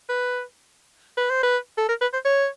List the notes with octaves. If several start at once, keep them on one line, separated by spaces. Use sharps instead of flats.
B4
B4
C5
B4
A4
A#4
B4
C5
C#5